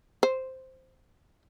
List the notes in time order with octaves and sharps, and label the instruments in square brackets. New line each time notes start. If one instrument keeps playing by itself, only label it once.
[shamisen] C5